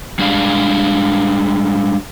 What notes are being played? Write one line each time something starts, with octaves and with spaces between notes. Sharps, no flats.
G3 G#3 D4 G#4 D5 F5